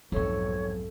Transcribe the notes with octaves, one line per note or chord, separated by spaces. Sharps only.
B1 F2 G#2 F#3 A3 C4 C#5